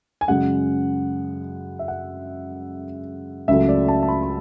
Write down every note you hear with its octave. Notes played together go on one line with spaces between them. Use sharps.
G#5
F#2 C#3 G#3 F#5
E5
F#5
C#2 C#3 F#3 A3 E5
D5
A5
A5
B5
B5